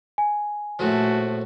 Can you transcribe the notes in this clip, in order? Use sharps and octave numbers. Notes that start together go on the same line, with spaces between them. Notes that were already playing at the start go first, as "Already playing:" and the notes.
G#5
A#1 A2 F3 A3 F#4